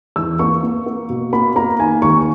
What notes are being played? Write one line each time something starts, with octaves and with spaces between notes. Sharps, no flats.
E2 E6
A#3 C#6
A#3
A#3
B2
A#3 B5
A#3 A#5
D#3 G#5
D#2 C#6